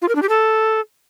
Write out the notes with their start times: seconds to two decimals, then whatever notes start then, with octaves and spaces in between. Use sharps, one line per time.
0.02 F4
0.09 A#4
0.15 D4
0.22 G4
0.29 A4